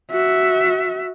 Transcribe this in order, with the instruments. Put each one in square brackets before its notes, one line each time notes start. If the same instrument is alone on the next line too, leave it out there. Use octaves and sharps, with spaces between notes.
[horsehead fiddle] F#4 E5